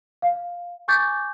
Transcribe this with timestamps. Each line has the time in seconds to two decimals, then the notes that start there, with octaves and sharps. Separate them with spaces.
0.22 F5
0.88 G#5 C#6 D6 G6 A6